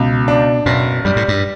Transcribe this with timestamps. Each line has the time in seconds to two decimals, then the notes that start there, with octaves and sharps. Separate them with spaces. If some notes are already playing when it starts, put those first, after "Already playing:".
Already playing: C#2 B2
0.28 D4
0.66 F#1 B2
1.05 G2 G3
1.16 A2
1.28 G2